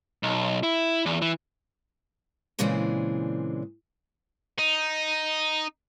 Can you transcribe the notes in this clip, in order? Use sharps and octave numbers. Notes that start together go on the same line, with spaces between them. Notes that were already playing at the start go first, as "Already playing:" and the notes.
B1
E4
E2
E3
A#2 C#3 E3 G#3 C4 D4
D#4